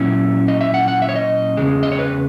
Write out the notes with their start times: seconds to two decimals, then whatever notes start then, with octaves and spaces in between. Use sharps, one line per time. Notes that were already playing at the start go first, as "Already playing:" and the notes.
Already playing: A#2 F#3 C#4 E4
0.48 D#5
0.61 E5
0.74 F#5
0.88 F#5
1.02 E5
1.09 C#5
1.16 D#5
1.57 E2 C#3 G#3
1.83 D#5
1.92 C#5
1.99 B4